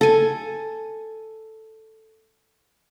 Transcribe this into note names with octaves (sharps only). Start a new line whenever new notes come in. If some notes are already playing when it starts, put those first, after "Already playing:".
A4 G#5